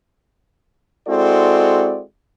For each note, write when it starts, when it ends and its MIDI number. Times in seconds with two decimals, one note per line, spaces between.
1.08 2.01 56
1.08 2.01 60
1.08 2.01 64
1.08 2.01 66
1.08 2.01 69
1.08 2.01 74